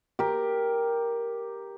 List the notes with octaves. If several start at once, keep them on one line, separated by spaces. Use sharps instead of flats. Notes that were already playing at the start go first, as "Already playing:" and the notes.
G4 A#4